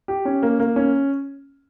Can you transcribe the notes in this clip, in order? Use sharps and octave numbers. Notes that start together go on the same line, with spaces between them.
G4
C#4
A#3
A#3
C#4